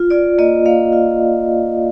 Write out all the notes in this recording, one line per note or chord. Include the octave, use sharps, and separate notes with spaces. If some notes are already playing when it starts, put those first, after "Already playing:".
Already playing: F4
F4 D5
A#3 D#5
A#3 F5
F4